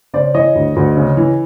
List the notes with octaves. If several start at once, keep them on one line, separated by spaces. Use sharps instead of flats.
C#3 C5 D5
E3 C#5 D#5
D2
D2
C#3
E3